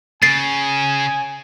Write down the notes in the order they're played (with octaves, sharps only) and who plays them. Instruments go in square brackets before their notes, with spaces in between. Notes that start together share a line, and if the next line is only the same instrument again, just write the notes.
[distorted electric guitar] C#3 [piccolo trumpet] G#5 [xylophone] A6 C7